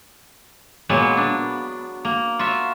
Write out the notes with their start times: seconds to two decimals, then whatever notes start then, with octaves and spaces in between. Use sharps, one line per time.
0.89 A#2 F#3 G#3 B3
1.17 B3 D4
2.05 A#3
2.39 F4 F#4 E5